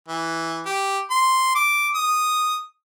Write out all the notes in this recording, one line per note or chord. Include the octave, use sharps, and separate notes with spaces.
E3
G4
C6
D6
D#6